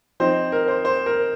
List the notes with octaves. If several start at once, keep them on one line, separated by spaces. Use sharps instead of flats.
F3 C4 D#4 C5
A#4
C5
C5
A#4